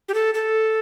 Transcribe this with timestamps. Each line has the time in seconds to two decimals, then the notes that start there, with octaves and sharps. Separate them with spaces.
0.08 G4
0.14 A4
0.34 A4